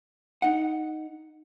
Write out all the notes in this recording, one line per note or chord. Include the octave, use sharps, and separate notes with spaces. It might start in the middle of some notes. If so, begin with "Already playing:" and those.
D#4 F#5